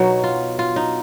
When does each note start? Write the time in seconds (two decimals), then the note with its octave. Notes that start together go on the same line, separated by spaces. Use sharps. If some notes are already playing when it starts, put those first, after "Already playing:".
Already playing: B2 F#3 D#4
0.24 F4
0.59 F4
0.76 D#4